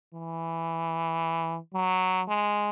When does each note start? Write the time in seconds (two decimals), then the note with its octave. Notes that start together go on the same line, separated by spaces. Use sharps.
0.14 E3
1.74 F#3
2.28 G#3